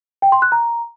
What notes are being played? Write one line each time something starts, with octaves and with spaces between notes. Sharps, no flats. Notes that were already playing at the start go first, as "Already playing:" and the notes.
G5
C6
F#6
A#5